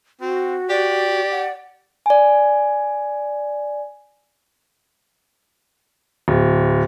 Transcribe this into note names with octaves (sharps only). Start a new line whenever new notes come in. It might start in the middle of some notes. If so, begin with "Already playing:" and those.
C4 F#4
G4 D5
F#5
D5 G#5
D1